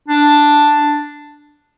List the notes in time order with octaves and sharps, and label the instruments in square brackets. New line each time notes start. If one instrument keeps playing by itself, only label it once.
[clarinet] D4